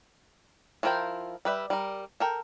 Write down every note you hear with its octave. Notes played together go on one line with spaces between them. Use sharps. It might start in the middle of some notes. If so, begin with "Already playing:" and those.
F3 E4 F4 A#4 G5
G3 B4 E5
G3 A#4
A4 A#4 G5